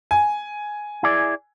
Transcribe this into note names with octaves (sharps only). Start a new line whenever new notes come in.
G#5
E4 G#4 D5